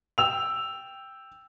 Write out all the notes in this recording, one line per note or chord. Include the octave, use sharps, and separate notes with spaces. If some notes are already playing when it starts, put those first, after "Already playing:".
G5 E6 F7